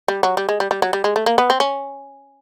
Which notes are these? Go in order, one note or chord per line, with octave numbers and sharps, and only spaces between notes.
G3
F#3
G3
G#3
G3
G3
F#3
G3
G#3
A3
A#3
B3
C4
C#4